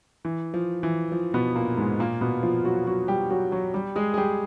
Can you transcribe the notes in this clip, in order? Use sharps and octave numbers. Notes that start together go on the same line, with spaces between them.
E3
F3
E3
F3
B2 B3
A#2 A#3
G#2 G#3
A#2 A#3
B2 B3
F3 F4
F#3 F#4
F#3 F#4
G3 G4
F#3 F#4
F#3 F#4
G3 G4
G#3 G#4
G#4
G3 G4